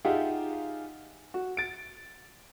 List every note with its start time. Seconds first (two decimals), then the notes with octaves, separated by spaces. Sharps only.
0.05 D#4 F4 G4 G#4 E5 F#5
1.34 F#4
1.57 A6 D7